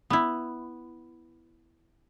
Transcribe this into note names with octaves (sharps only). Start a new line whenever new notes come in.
B3 E4